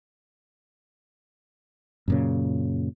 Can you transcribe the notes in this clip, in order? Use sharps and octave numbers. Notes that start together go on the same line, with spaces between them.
F#2 A#2 C#3